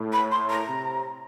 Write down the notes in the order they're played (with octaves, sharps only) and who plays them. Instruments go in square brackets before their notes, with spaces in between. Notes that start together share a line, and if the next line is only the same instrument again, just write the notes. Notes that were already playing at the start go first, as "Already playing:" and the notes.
Already playing: [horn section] A2
[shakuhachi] B5
C6
A#5
[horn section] C3